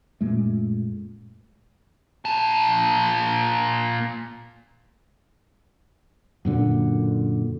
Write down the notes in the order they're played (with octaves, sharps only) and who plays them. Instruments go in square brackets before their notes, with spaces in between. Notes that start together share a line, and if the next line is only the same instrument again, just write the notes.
[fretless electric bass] F#2 A#2 G#3 A3
[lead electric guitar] A#2 A5
[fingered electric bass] F#2 A#2 D3